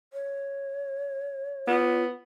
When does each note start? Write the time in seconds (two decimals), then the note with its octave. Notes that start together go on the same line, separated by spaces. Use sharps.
0.13 C#5
1.67 B3 F4